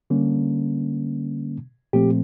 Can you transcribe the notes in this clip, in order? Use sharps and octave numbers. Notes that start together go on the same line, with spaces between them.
D3 G3 A#3 C#4
A#2 F3 A3 C4 G4